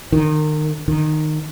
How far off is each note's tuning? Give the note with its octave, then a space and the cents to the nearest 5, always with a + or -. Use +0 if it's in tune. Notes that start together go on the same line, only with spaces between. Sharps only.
D#3 -30
D#3 -15